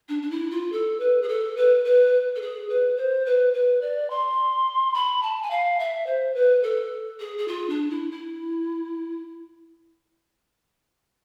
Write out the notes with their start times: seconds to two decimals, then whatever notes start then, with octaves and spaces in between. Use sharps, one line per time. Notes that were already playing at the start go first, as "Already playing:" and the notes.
0.09 D4
0.22 D4
0.31 E4
0.51 F4
0.72 A4
1.00 B4
1.22 G#4
1.29 A4
1.57 B4
1.85 B4
2.36 A4
2.41 G#4
2.69 B4
2.97 C5
3.26 B4
3.54 B4
3.81 D5
4.10 C6
4.94 B5
5.23 A5
5.42 G#5
5.50 F5
5.79 E5
6.06 C5
6.34 B4
6.63 A4
7.20 G#4
7.38 G#4
7.48 F4
7.69 D4
7.90 E4
8.11 E4